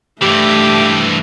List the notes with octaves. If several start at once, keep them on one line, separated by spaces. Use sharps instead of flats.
G2 E3 A3 G4